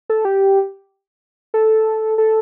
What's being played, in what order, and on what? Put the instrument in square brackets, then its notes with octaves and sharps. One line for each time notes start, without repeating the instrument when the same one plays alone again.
[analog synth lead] A4
G4
A4
A4